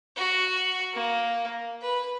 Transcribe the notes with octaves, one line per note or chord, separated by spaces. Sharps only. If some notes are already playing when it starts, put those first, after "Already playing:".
F#4
A#3
B4